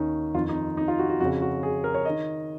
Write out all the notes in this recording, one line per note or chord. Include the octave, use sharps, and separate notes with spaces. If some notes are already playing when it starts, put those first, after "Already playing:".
Already playing: D#2 D#3 C#4 D#4
F2 D#3 F4
D#4
D#4
F4
F#4
F#4
F2 C#3 F#4
F#4
G#4
A#4
C#5
D#3 D#5